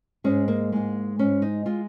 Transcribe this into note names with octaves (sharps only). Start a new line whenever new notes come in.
G#2 G#3 C#4
A#3
G#2 G#3
G#2 G#3 C#4
D#4
G#3 F4